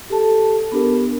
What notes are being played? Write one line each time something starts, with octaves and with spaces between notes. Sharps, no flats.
G4 A4 A5
B3 D4 G4 A#4